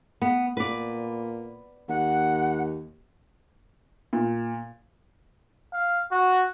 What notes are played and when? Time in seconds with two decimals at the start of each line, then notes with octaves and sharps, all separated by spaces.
0.22 B3
0.57 A#2 B4 D5
1.89 D#2 F#5
4.13 A#2
5.74 F5
6.12 F#4